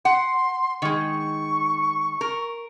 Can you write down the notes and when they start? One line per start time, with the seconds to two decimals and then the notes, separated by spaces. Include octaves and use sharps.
0.05 F#5 C6
0.82 D#3 G#3 C#6
2.21 A#4